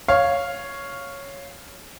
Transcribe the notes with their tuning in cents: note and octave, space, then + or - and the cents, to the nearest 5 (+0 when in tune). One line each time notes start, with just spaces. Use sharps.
C#5 +0 F5 +0